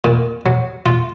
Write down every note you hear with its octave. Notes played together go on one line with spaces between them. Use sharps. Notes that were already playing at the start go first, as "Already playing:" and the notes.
A#2
F#3
F4